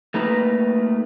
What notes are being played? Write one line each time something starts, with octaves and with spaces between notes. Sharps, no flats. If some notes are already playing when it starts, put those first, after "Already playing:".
A3 A#3 D#4 B4